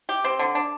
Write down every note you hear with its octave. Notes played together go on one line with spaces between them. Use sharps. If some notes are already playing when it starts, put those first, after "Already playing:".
G4
C4
D3
D4